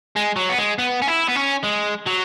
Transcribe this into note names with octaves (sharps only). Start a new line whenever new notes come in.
G#3
F#3
B3
G#3
B3
C#4
E4
B3
C#4
G#3
F#3